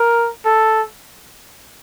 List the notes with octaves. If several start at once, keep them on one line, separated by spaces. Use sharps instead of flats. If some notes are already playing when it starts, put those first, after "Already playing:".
Already playing: A#4
A4